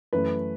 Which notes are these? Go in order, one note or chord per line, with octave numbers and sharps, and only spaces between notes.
F#2 E3 A3 B4